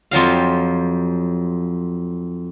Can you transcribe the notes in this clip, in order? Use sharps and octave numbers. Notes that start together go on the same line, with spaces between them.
F2 F3 F#3 F5